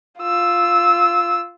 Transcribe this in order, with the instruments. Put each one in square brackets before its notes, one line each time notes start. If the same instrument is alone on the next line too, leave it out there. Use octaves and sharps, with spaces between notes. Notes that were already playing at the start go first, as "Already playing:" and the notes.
[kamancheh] F4 E6